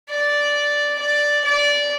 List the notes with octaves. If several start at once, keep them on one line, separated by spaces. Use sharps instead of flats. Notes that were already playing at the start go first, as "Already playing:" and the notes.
D5
D5
D5